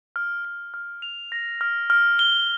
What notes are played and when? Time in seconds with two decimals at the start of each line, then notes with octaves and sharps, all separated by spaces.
0.16 F6
0.45 F6
0.74 F6
1.02 F7
1.32 A#6
1.61 F6
1.90 F6
2.19 G7